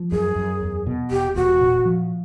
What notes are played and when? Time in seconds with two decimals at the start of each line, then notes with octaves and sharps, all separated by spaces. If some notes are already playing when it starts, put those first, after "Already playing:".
Already playing: F3
0.12 F#2 G#4
0.36 F#2
0.61 E2
0.87 B2
1.11 E1 G4
1.35 E1 F#4
1.61 A#2
1.85 F3